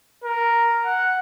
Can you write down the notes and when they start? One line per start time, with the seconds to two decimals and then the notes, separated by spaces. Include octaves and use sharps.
0.24 A#4
0.85 F#5